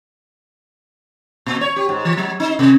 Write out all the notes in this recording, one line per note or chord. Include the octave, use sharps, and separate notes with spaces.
A#2
C#5
G4
G#2
E3
F#3
D#4
C3